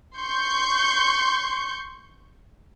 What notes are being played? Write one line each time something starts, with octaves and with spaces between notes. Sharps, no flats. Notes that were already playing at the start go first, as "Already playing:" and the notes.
C6 C#6 G6